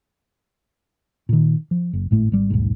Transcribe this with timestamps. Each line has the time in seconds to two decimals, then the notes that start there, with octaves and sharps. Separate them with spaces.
1.29 A#2 D#3
1.71 F3
1.93 F#1
2.11 G#1 A2 A3
2.32 G#1 G3
2.50 D#1 B1 G#2